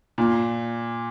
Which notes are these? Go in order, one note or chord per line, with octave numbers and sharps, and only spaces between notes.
A#2